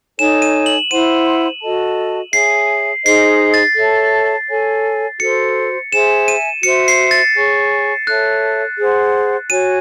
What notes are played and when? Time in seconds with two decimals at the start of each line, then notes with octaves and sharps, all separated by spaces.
0.19 D#4 A4 C#5 G#5 E7
0.42 D#7
0.66 F#7
0.90 E4 C5 F#5 C6 D#7
1.62 F#4 A4 D#5 A5
2.33 G#4 C#5 E5 G#5 C7
3.05 D#4 G#4 C5 D#5 C7
3.54 A6
3.77 A4 C#5 E5 A5
4.49 A4 C#5 G#5
5.20 F#4 A4 C5 C#7
5.92 G#4 C5 E5 G#5 E7
6.28 D#7
6.63 F#4 C5 E5 C#7
6.88 C7
7.11 A6
7.36 G#4 C#5 G#5 C#6
8.07 A4 C#5 E5 A5 F#6
8.78 G#4 C5 F#5
9.50 F#4 C#5 G#5 D#7